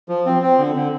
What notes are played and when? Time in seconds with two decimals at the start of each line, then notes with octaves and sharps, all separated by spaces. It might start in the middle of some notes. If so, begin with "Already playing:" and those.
0.09 F3
0.26 C4
0.42 C4
0.59 D3
0.75 D3